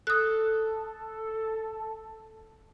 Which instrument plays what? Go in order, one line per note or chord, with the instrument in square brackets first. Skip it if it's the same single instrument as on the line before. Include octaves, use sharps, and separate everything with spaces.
[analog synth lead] A4 [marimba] D#6 F#6